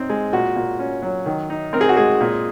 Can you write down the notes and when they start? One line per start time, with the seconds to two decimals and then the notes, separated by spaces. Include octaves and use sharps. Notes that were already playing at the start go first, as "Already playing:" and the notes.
Already playing: C4 D#4
0.10 G#3
0.33 A#2 F#4
0.56 A#2
0.79 C#4
1.03 F#3
1.26 D#3
1.50 D#4
1.73 C4 A#4
1.81 G#4
1.89 F#4
1.97 G#3 G#4
2.21 A#2